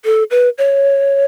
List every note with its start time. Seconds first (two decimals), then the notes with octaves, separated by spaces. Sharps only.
0.05 A4
0.31 B4
0.58 C#5